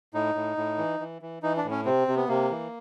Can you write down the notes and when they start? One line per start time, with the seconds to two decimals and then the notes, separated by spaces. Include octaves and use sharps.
0.14 A2 D#4
0.35 A2
0.57 A2
0.78 E3
1.00 E3
1.22 E3
1.43 E3 D#4
1.57 D4
1.64 A2
1.71 C#4
1.85 C3 C4
2.08 C3
2.17 B3
2.28 C3 A#3
2.51 E3